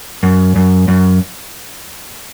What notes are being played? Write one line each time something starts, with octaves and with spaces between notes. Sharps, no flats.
F#2
F#2
F#2